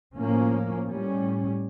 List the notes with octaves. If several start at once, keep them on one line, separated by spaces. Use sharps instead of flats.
A2 F3 A#3 C#4
A2 G3 C#4